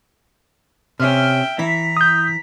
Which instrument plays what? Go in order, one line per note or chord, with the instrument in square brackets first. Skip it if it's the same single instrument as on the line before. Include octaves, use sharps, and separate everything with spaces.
[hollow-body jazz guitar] C3 C#4 [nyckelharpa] E5 G5 [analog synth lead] F6
[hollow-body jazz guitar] E3 E4 [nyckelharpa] A#5 [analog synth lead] B6
[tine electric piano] D#6 G6